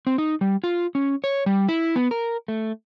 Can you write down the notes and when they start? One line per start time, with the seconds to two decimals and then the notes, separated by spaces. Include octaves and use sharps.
0.07 C4
0.18 D#4
0.41 G3
0.64 F4
0.95 C#4
1.24 C#5
1.46 G3
1.69 E4
1.96 B3
2.11 A#4
2.48 A3